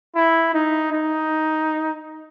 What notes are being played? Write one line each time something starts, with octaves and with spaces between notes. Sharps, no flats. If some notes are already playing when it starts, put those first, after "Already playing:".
E4
D#4
D#4